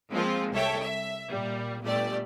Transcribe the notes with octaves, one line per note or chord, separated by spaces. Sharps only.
F3 G#3 A#3 C4 F4
C2 A4 C#5 E5 G5
E5
A#2 G3
G1 A#2 G3 A3 G4 D5